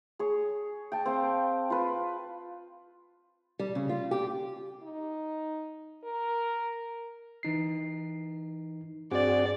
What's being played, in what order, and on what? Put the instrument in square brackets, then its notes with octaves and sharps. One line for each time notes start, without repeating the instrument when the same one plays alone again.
[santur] G#4 C#5
G5 A5
C4 F5 G5
F4 B4
[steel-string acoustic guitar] G3
C#3
F4
G4
[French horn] D#4
A#4
[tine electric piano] E3 D#4 C7
[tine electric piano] G2 [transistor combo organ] C4 F#4 G#4 [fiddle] D5